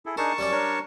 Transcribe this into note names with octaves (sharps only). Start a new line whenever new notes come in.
E4 G#4 A4
D4 D#4 G#4 A#4 A5 C#6
F#2 G3 C#4 D5
D4 A#4 C#5